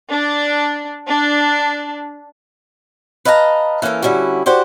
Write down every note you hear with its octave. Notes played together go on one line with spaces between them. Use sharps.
D4
D4
B4 D#5 F5 A5 A#5
E3 A#3 C#4 A4 A#4
D3 G3 C#4 E4 F#4
F#4 G4 C5 D5 F#5